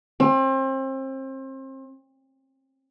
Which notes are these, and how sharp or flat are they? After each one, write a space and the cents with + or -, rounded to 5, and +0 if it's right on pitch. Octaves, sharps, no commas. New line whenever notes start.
C4 +35